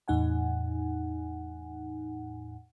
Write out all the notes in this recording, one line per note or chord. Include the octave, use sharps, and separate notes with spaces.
E2 A2 D#4 F#5 G#5